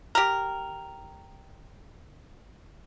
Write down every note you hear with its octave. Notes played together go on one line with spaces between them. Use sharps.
G4 A#4